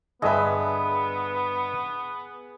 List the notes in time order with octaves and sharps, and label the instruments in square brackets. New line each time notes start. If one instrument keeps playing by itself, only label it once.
[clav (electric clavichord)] G2 D3 [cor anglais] B3 [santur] G#4 B4 [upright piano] D#5 E5